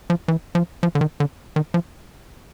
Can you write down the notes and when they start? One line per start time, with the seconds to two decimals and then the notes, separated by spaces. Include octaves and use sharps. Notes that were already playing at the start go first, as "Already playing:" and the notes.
0.10 F3
0.28 E3
0.55 F3
0.83 F3
0.95 D3
1.01 D#3
1.20 D3
1.56 D#3
1.74 F3